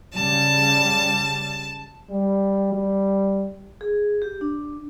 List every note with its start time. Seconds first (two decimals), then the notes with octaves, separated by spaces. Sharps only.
0.14 C#3 G3 A5
2.10 G3
2.73 G3
3.81 G#4
4.22 G4
4.41 D4